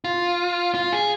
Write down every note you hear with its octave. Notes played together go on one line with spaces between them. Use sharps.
F4
F4
G#4